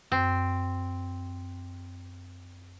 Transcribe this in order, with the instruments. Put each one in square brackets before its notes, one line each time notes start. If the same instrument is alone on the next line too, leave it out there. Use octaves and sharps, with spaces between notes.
[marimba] F#2 [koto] C4